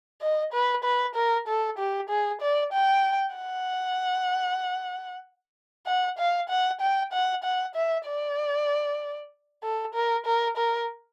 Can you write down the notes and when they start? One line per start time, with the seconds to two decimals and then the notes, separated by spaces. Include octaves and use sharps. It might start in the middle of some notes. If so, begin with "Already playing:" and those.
0.22 D#5
0.53 B4
0.84 B4
1.15 A#4
1.48 A4
1.78 G4
2.09 G#4
2.41 D5
2.73 G5
3.36 F#5
5.87 F#5
6.18 F5
6.49 F#5
6.81 G5
7.13 F#5
7.44 F#5
7.75 E5
8.06 D5
9.63 A4
9.94 A#4
10.26 A#4
10.57 A#4